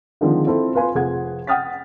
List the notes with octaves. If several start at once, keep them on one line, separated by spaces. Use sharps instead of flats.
D3 D#3 F3 G#3 C4 D4
C4 E4 F4 A4
F4 B4 F5 G#5 C6
F1 F3 G#4 F#5 G#6
F#5 G5 D#6 F6 A6 B6